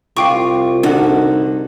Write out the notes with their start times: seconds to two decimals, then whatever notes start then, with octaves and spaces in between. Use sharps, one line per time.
0.17 C2 F4 F5 G5 C#6 D6
0.83 D3 D#3 F#4